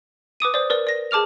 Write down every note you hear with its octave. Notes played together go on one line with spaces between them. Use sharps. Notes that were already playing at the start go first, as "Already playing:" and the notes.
B4 D6 D#6 D#7
C5 D5
A#4 B4 D5
D5 A#6
G#4 A5 D6 F6 F7